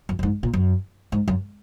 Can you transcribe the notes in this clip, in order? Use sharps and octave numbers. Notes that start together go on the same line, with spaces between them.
F#2
F#2
G#2
A#2
F#2
G#2
F#2